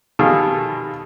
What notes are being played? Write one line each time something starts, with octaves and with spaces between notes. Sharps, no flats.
B2 D#3 G3 F4 G#4 A4